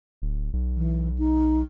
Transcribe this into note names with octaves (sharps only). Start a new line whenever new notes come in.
D1
B1
E3
D#4